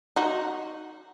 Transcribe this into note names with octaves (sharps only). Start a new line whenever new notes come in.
D#4 F#4